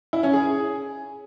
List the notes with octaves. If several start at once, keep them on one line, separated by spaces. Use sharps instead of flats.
E4
C#4
G#4